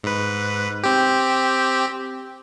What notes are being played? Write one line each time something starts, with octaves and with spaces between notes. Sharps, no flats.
G#2 B4
C4 G4